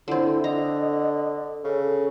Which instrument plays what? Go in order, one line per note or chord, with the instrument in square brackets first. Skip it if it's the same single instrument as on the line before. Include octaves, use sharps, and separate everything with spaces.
[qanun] D3 C4 [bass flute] E4
[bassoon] D3 [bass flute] D#5 [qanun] A#5
[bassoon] C#3 [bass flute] A4